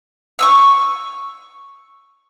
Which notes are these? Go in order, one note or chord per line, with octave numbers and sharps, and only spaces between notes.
C#6 D#6 E6